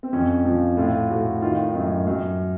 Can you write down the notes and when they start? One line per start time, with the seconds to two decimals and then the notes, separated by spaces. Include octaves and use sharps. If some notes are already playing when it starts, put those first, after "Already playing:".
0.03 C4
0.13 F2 C#4
0.45 F3
0.77 A2 F4
1.10 A2 F#4
1.42 D#3 F4
1.64 D#4
1.75 F#2
2.07 F#2